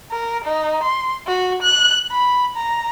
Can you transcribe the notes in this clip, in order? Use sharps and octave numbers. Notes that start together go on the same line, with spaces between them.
A#4
D#4
C6
F#4
F#6
B5
A#5